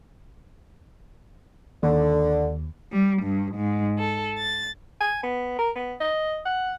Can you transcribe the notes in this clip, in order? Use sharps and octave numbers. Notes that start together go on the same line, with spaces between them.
D#2 D3
G3
G2
G#2
A4
A6
G#5
B3
A#4
B3
D#5
F#5